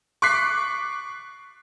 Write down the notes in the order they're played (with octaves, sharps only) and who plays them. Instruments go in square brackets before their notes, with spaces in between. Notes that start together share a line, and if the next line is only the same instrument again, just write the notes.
[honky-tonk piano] C#6 D6 F#6 B6 C7